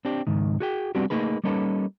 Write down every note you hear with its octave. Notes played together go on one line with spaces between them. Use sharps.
C4 D4 G4
C#2 G#2 D#3
F#4 G#4 G5
G3 B3 C4 D4 F#4 G4
A3 A#3 D#4 G#4 B4
G3 A#3 C#4 D#4 A4 B4